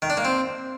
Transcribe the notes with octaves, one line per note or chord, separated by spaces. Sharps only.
D#3
D4
A#3
C4